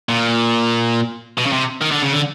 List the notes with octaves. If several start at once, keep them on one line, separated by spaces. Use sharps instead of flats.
A#2
B2
C#3
C3
D#3
D3
C#3
D3